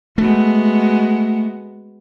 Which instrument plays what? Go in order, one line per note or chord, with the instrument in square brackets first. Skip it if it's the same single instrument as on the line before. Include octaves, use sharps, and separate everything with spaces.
[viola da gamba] G#3 B3 F#4 [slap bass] A3